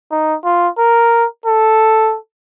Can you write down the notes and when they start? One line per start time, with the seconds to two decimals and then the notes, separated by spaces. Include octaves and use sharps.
0.11 D#4
0.45 F4
0.79 A#4
1.46 A4